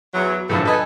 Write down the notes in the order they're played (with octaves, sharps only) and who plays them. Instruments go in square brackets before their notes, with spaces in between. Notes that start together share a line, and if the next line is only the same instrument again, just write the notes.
[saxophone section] E2 E3 F#3
[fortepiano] A#1 F#2 A2 [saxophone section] C#3 B3 A4
[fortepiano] A4 D#5 G#5 [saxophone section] B4